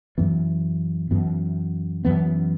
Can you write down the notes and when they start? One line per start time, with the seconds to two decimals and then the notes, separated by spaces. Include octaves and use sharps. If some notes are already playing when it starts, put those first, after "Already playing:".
0.18 F#2 E3 B3
1.11 F#2 E3 B3
2.05 F#2 E3 B3